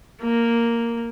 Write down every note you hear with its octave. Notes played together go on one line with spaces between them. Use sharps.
A#3